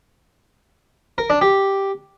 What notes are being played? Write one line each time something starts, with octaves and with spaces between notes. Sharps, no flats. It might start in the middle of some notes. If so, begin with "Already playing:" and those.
A#4
D4
G4